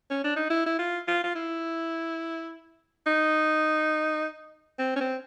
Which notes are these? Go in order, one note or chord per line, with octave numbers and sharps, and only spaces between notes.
C#4
D4
D#4
E4
E4
F4
F4
F4
E4
D#4
C4
C#4
C4